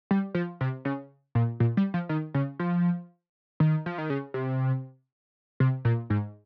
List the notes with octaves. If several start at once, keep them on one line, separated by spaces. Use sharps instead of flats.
G3
F3
C3
C#3
A#2
A#2
G3
F3
D#3
C#3
F3
D#3
F3
D#3
C#3
C3
C3
A#2
G#2